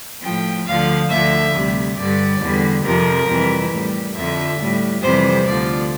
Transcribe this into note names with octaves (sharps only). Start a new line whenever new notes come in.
A2 F3 G5
D2 D3 F3 F5
D2 D3 F3 E5
D2 C3 G3
G2 D3 G3 D5
E2 D3 G3
F2 C3 F3 A#4
F2 C3 E3 G3
A2 G3
F2 D3 F3 E5
A2 G3
F2 C3 E3 G3 C5
D2 D3 F3 D5